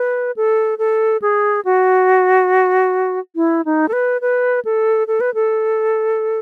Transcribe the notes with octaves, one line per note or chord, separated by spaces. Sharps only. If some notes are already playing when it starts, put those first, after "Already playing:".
Already playing: B4
A4
A4
G#4
F#4
E4
D#4
A4
B4
B4
A4
A4
B4
A4